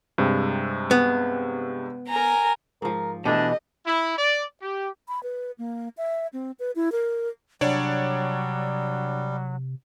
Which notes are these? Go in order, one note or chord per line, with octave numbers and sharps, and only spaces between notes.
G2 C3 G#3
B3
A#4 G#5 A#5
G#2 F3 A#4
B2 E3 A3 D4 G4 D#5
E4
D5
G4
B5
B4
A#3
E5
C4
B4
E4
A#4
C3 F#3 G3 D4 C#5 D5